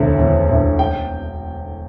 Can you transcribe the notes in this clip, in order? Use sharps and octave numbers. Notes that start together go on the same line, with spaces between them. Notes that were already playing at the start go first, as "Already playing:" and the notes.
Already playing: E1 D2 D3
E1
D2 D3
G5